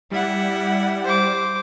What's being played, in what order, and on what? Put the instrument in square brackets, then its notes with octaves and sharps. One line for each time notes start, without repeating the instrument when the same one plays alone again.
[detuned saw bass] G3 [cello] E4 F#5
[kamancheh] C5 D6